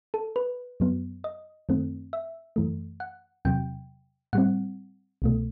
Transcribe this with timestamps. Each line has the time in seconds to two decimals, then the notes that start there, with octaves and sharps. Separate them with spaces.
0.14 A4
0.36 B4
0.80 F#2 F#3 B3
1.24 D#5
1.69 F#2 D#3 A3 C4
2.13 E5
2.56 F#2 E3 A3
3.00 F#5
3.45 E2 C3 F#3 G5
4.33 A2 G3 C4 F#5
5.22 C2 B2 A3